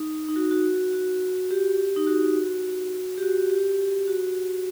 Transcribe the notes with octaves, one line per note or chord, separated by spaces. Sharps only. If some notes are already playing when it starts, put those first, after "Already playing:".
Already playing: D#4
D#4
F#4
F#4
F#4
G4
D#4
F#4
G4
F#4
G4
F#4